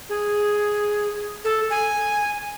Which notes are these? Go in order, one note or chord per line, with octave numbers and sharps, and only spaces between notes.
G#4
A4
G#5